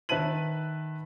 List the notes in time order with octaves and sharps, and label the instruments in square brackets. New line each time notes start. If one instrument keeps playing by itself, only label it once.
[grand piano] D#3 B4 E5 A5 D#7 F#7